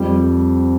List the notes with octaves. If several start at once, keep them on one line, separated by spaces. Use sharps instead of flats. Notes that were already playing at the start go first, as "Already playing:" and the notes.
Already playing: F2 G3
G3